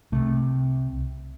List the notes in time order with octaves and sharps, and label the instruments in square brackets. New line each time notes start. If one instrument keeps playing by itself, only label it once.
[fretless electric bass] C2 C3 A3